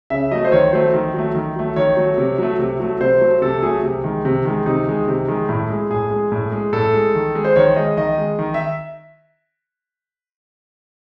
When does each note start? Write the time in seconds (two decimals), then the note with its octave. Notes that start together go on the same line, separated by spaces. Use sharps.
0.10 C#3 E5
0.31 F#3 A3 D#5
0.45 C5
0.52 D#3 C#5
0.73 F#3 A3 C5
0.94 D#3
1.14 F#3 A3
1.35 D#3
1.56 F#3 A3
1.76 D#3 C#5
1.97 F#3 A3
2.18 C3
2.38 F#3 A3
2.59 C3
2.80 F#3 A3
3.00 C3 C5
3.21 F#3 A3
3.42 C3 A4
3.62 F#3 A3 G#4
3.83 C3
4.04 D#3 G#3
4.25 C3
4.45 D#3 G#3
4.66 C3 D#4
4.87 D#3 G#3
5.08 C3
5.28 D#3 G#3
5.49 A2 E4
5.70 G#3
5.90 A2 G#4
6.11 G#3
6.32 A2
6.52 G#3
6.73 A2 A4
6.94 G#3
7.15 D#3
7.35 G#3
7.45 C5
7.56 D#3 C#5
7.76 G#3 D#5
7.97 D#3 D#5
8.18 G#3
8.39 D#3
8.54 E5